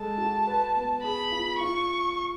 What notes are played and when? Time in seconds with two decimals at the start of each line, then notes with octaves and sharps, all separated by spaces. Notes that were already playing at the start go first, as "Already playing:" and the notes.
Already playing: G#3 A4 A5
0.18 F#4
0.47 B4
0.75 B3
1.03 G#4 B5
1.32 F4
1.60 F4 C#6